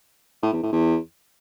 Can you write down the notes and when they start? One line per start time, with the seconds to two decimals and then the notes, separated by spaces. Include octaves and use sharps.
0.42 A2
0.52 E2
0.62 A2
0.72 E2